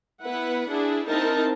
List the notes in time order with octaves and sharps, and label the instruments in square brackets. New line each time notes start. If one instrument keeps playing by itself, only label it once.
[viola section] B3 E4 B4 F#5
D4 E4 G#4
C4 D#4 E4 A#4 A5